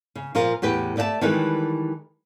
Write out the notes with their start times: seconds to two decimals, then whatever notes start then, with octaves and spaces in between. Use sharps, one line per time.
0.15 C#3
0.35 A#2 F3 F4 A#4
0.62 E2 A2 G4 B4
0.97 A3 D5 E5 F#5 A5
1.21 D#3 E3 G3 G#3 A4 B4